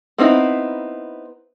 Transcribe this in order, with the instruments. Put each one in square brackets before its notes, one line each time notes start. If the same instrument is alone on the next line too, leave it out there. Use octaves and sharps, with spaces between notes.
[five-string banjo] B3 C4 D#4 E4